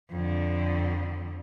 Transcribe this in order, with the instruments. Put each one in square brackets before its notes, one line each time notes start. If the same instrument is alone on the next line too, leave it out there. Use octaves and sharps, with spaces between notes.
[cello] F2 D3